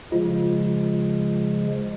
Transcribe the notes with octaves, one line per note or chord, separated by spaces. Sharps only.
C#3 F3 G#3 F4